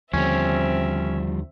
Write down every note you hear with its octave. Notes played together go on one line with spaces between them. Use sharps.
D#2 D3 F3 G3 C4 C#4 E5